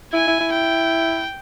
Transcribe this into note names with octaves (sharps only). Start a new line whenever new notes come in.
E4 G#5
E4
E4
G5